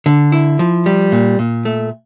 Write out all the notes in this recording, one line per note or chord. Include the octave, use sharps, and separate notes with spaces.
D3
E4
F3
G3
A#2
A#2
A3